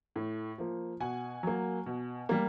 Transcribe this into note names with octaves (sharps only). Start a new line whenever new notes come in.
A2
F3 A#3
B2 F#5 G#5
F#3 A#3
B2
G3 A#3